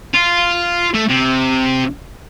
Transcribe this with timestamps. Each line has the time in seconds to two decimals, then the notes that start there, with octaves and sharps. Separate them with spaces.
0.14 F4
0.94 A3
1.09 C3